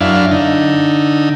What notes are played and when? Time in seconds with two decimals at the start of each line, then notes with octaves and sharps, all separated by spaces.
0.01 F#2 D4 E4 F5
0.31 D3 D#4